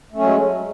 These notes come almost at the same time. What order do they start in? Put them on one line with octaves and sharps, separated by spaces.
A3 C#4 F#3 G#3